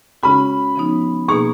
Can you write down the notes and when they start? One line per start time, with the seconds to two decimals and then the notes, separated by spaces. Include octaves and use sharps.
0.23 C#3 G#3 C#4 F#4 B5
0.76 C#3 F3 B3 D#4
1.28 B2 A#3 D#4 G#4 C#6